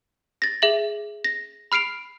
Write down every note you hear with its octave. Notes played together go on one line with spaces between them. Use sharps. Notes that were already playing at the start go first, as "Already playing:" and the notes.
A6 A#6
G#4 E5 F#7
A#6
B5 F6 C7 D7 F7